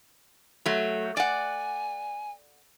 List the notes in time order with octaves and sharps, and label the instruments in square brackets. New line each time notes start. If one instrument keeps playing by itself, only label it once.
[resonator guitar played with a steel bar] F#3 A3
[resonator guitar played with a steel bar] D5 F#5 [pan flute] G#5